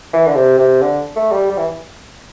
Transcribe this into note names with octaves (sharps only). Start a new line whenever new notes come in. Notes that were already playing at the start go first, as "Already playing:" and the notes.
E3
D3
C3
C3
D3
A3
G3
G3
E3